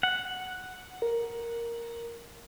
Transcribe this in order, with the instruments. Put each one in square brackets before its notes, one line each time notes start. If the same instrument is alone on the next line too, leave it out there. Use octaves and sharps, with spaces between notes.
[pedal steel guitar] F#5
[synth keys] A#4